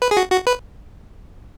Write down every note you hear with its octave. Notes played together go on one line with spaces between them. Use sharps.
B4
G#4
F#4
F#4
B4